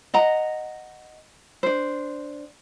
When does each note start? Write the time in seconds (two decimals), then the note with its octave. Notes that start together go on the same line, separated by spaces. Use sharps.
0.14 D#5 F#5 A#5
1.63 D4 C5